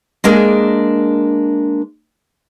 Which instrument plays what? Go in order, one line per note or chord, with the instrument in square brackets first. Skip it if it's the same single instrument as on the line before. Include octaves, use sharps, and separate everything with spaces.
[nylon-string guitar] G#3 A#3 D4 G#4 A#4